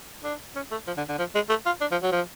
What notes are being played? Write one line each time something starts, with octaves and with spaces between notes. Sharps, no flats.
D4
C#4
A3
F3
D3
D3
F3
G#3
A3
F4
D4
F3
F#3
F3